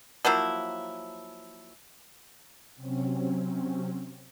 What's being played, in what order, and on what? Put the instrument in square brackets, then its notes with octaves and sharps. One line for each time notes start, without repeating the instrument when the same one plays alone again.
[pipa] F3 F#3 A#3 E4
[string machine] C3 F#3 C4 C#4